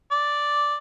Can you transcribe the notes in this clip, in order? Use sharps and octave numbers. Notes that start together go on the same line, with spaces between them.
D5